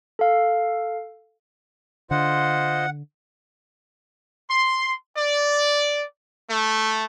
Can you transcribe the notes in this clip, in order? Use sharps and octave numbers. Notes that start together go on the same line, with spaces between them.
A4 F5
D3 F4 C5 D#5 F#5
C6
D5
A3